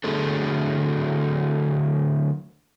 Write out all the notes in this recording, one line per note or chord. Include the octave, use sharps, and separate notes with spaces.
D3 F#3 A3 F#4 G#4 A4